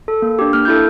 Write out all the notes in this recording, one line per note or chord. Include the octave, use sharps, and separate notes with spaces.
A4
A#3
D4 G4
A#3 F6
E4 A4 G6